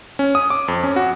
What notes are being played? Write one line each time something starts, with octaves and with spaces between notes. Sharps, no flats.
C#4
D#6
D6
F2
C#4
F#4